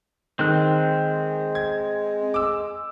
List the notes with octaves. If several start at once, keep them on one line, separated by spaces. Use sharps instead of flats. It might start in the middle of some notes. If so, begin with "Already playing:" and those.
D#3 G#3 C4 F#6
G#6
D6 E6